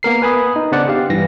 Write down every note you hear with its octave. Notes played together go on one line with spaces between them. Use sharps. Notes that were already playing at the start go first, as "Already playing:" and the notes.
A#3 B3 A#4 C7
B4 G#5 B5 D#6
D#4
C#3 B3 D4 C5 D5 F#5
G4 F5
G2 E3 A#6